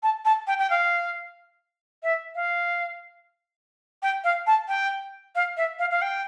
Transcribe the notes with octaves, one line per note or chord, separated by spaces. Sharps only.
A5
A5
G5
G5
F5
E5
F5
G5
F5
A5
G5
F5
E5
F5
F5
G5